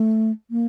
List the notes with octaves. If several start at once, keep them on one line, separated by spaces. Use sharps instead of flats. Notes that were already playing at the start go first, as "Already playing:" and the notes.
Already playing: A3
A#3